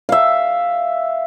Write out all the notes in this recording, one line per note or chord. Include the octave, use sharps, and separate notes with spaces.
E5 F5